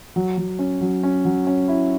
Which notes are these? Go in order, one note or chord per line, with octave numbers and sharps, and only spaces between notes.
F#3
F#3
C#4
F#3
C#4
F#3
C#4
E4